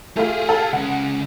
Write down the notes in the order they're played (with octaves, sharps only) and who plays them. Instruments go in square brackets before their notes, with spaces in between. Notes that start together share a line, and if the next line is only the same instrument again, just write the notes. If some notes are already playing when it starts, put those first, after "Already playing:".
[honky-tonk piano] A3 F4 [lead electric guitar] G4 G#4
[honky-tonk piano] A4 F5
[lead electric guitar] C#2 C#3 [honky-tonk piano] F#5